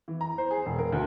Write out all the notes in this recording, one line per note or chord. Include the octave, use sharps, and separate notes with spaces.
E3
A#5
C5
G#4
E1
A#4
D2